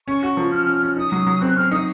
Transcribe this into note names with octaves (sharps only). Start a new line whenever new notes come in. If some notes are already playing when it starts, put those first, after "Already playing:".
C#4 C#6
F#4
F3
C#4 F6
C#4
C#4
D#4 D#6
F#3
F#3
C4 F#6
C4 F6
D#4 D#6